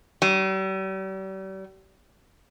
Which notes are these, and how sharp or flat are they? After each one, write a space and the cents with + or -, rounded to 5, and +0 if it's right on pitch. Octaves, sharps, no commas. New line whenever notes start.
G3 -40